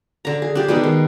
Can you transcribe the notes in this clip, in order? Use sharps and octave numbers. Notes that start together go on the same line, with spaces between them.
D3 A#5
G#4
D4 G4
B2 G#3 D#4
D#3